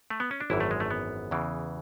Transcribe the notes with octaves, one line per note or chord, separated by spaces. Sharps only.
A3
B3
C#4
D4
G#1 F#2 E3 E4
A3
G#3
A3
B3
E2 C#3 E3